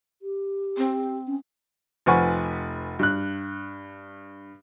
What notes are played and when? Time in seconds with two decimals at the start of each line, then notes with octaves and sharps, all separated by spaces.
0.22 G4
0.77 C4
1.27 C#4
2.06 F1 F3 B4 F#5 G#5 C#6
2.99 G2 F#6